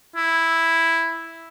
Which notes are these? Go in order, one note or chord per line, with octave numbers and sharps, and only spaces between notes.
E4